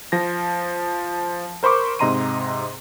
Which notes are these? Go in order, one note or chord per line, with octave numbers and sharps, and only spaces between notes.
F3 A#6
A#4 C5 B5 C#6 D6
G#2 C3 D#5 A#5 C6 D#7